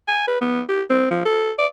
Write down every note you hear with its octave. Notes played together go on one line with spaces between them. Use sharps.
G#5
B4
B3
G4
C4
F3
A4
D5